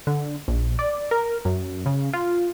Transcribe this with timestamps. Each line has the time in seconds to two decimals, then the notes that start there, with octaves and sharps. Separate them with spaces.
0.07 D3
0.48 A#1
0.79 D5
1.11 A#4
1.45 F#2
1.86 C#3
2.13 F4